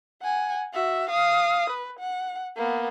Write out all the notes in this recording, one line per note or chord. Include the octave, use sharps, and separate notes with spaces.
F#5 G#5
F#4 E5
F5 D#6
B4
F#5
A#3 B3